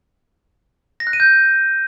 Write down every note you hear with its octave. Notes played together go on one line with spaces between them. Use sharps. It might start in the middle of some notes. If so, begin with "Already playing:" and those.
A#6
F#6
D#7
G6